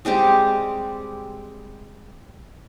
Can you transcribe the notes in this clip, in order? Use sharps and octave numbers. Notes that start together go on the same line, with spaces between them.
G3 G#3 C4 G4